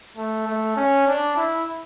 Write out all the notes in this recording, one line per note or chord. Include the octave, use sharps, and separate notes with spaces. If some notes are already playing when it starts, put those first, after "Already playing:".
A3
A3
C#4
D4
E4